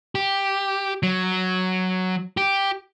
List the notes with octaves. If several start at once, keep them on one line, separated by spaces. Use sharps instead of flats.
G4
F#3
G4